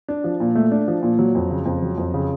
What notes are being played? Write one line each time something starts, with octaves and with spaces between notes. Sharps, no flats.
D4
F3
A#2
A3
D4
F3
A#2
F#3
F2
C#3
F2
F#3
F2
C#3